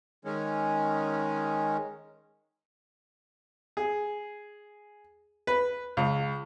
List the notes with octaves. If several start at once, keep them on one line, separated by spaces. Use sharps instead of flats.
D#3 G#3 C#4
G#4
B4
C#2